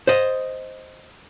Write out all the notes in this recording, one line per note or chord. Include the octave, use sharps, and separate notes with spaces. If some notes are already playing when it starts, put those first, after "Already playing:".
C5 D#5